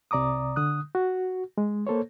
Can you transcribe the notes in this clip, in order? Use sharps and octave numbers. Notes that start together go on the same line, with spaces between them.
C2 C3 D5 A#5 D6 D#6
D3 D#6 F#6
F#4
G#3
A#3 A4 C5 C#5